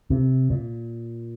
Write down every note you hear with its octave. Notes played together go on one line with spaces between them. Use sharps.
C3
A#2